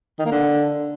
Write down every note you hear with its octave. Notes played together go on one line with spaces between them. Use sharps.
D#3
A#3
D3